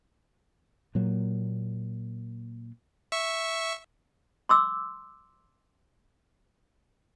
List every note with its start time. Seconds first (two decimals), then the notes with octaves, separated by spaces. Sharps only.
0.95 A#2 F#3 A#3
3.12 E5 C#6
4.49 C6 D6 E6